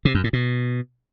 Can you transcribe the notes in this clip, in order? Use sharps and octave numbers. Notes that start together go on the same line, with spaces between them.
C3
F#2
A2
B2